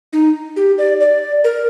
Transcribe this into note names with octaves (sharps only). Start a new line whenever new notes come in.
D#4
G4
D5
D5
A#4